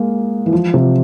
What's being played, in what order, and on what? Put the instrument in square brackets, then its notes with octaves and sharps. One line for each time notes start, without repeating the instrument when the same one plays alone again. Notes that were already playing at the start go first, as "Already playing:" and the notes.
Already playing: [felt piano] G#3 A#3
E3
F3
C3